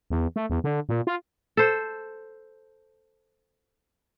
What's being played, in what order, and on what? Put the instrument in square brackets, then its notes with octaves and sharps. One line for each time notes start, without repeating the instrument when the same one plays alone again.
[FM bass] E2
A3
E2
D3
A#2
F4
[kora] A4 C5